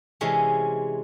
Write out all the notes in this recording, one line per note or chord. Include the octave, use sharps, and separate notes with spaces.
C3 E3 G#3 C#4